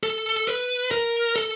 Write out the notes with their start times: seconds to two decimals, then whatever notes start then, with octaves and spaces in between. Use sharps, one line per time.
0.03 A4
0.47 B4
0.91 A#4
1.36 A4